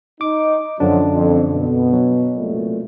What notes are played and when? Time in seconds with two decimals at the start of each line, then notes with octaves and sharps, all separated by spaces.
0.21 D#4 D6
0.80 F#2 D3 F3 F#3 D4
1.11 F2
1.52 B2
1.93 F#3
2.36 C2 A#2 A3